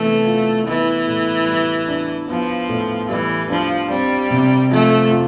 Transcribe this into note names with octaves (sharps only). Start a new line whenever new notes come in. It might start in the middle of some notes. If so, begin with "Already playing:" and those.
Already playing: C3 E3 A3 B3
F4
E3 B3
A2
G3
D4
F3 B3
A2
E3 G3
F3 D4
G3 C4
C3
F3 A3
F4